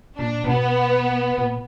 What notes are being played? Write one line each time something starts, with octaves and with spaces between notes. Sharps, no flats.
A#2 D4
A#2
B2 B3
A#2